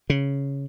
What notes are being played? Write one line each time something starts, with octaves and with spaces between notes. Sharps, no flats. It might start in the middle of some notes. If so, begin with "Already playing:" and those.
C#3